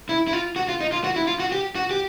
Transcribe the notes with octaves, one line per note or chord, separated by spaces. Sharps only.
E4
E4
F4
F#4
F4
D#4
F4
F#4
E4
F4
F#4
G4
F#4
G4